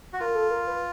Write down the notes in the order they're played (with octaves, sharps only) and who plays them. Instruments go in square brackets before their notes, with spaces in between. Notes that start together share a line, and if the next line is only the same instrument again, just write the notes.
[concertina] F#4
[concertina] F4 [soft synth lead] A#4
[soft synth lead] A4
A#4
B4